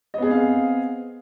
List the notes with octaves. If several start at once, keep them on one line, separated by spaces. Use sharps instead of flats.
B3 C4 G#4 D#5 F5